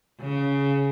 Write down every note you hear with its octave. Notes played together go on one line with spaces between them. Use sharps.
C#3